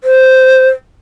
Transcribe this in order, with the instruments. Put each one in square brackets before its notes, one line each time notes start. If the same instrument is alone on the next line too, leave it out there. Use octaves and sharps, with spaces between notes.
[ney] C5